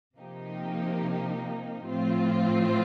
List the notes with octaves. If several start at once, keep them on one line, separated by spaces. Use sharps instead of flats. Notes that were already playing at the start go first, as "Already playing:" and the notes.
C3 F3 A#3 D#4 G4
A2 F3 C4 F4